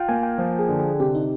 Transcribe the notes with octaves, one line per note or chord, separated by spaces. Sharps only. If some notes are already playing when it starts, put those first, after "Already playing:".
Already playing: F4 G5
A#3 G#5
G5
F3
G#4
D3
G#4
C3 G4
D#4